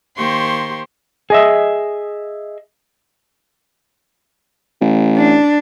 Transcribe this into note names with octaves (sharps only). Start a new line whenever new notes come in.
D#3 A#3 G4 C5 C6 C#6
G#4 D#5 E5
A1
D4